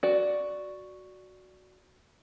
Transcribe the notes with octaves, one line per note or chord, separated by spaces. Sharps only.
F#4 D5